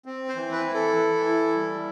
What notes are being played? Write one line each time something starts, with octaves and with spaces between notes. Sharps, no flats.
C4
C5
E3
B4
E4
A4
E3
E4
G3